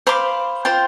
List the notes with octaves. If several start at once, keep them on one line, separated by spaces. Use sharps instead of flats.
C5 F5 B5 D6
F4 C5 G5 C6